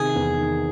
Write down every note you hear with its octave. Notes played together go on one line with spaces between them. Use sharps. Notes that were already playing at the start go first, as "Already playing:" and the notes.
Already playing: C3 D#3 G#4
E2
D#3